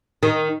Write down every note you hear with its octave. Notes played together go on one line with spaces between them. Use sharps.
D#3